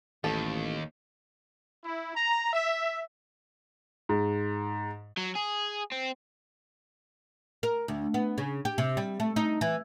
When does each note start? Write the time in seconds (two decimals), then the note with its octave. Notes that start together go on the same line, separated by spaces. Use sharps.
0.24 A1 D#2 A4
1.84 E4
2.15 A#5
2.53 E5
4.09 G#2
5.18 F#3
5.36 G#4
5.92 C4
7.63 A#4
7.88 D2
8.14 B3
8.38 C#3
8.65 G4
8.78 C3
8.97 G3
9.20 A3
9.36 D#4
9.61 E3